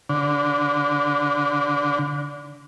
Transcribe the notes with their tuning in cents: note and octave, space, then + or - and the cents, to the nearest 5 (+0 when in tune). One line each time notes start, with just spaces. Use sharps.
D3 -20